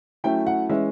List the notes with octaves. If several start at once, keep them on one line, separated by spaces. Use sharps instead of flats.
F#3 A3 C#4 E4 G5
F#5
E3 G#3 C#4 E5